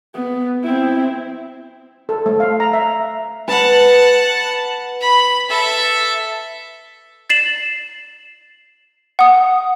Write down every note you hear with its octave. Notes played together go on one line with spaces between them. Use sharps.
B3
C4 E4
A4
A3
F5
A#5
E5
B4 F#5 A5
B5
A4 E5
A6 C7 E7 F#7
F#5 D#6